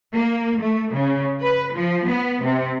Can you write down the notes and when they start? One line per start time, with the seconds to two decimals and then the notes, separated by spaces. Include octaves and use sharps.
0.15 A#3
0.61 A3
0.93 C#3
1.41 B4
1.74 F3
2.07 B3
2.43 C3